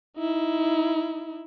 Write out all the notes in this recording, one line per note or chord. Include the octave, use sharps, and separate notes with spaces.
D#4 E4